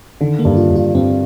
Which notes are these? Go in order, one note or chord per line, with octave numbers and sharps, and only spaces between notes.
D3 D#3
A#3
G2
F4
G2
F4
G2 C4